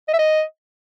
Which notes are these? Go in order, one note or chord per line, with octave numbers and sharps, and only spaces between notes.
D#5
E5
D#5